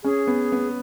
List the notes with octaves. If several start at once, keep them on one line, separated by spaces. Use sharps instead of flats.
C#4 G#4
B3
B3